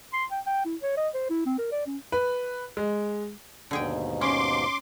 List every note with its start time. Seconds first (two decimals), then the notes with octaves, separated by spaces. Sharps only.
0.13 C6
0.31 G5
0.46 G5
0.65 E4
0.82 C#5
0.97 D#5
1.15 C5
1.30 E4
1.46 C4
1.59 A#4
1.72 D5
1.87 C#4
2.12 B4
2.77 G#3
3.71 D#2 G#2 B2 D3 G#4 G5
4.21 C#4 C6 D6